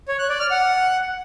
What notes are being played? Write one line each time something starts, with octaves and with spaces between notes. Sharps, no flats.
C#5
F#6
D5
F6
F#5